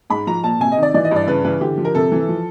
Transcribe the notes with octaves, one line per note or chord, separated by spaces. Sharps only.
G#2 B5
F3 A#5
A#2 A5
C3 G#5
D#5
D#3
D5
E3 D5
D#5
G2 D5
C#3 B4
E3 B4
D3 G4
F3
A#4
C3 A4
E3
F3